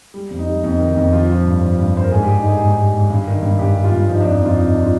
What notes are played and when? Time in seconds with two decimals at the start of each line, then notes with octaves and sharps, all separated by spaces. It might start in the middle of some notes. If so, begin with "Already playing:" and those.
0.14 G3
0.30 F2
0.39 D#4
0.47 G3
0.63 F2 D#4
0.79 D#3
0.88 D#4
0.96 F2
1.12 F3 F4
1.29 F3
1.45 G2
1.61 F3
1.79 G2
1.94 G2 C5
2.04 A#4
2.11 G#2 G#4
2.23 G3 G4
2.36 D#4
2.44 G3 G#4
2.61 G#2
2.77 G3
2.94 G#2
3.10 G2
3.27 D#3
3.42 G2
3.59 G2 G4
3.76 G3
3.84 F4
3.92 G2
4.08 F3 D#4
4.21 F2 D4
4.34 D#4
4.42 F2 F4
4.58 C3 D#4
4.74 D4
4.83 F4